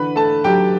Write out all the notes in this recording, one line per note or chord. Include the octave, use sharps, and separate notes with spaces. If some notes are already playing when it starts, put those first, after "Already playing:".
Already playing: D3 E3 B4 B5
A3 A4 A5
F#3 G4 G5